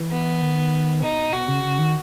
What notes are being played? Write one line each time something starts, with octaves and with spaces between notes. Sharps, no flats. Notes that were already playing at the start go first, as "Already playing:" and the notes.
Already playing: E3
B3
D#3
B2 D#4
B2 F#4
C#3
C#3
D#3